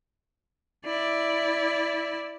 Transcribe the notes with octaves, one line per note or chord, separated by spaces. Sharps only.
E4 D5